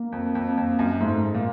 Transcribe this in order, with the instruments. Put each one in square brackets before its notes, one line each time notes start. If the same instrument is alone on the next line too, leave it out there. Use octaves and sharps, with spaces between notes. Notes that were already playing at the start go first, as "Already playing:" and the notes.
Already playing: [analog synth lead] A#3
[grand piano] F2
F2
F2
F#2
[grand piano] G#2 [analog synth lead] A3
[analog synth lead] G#3
[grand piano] A#2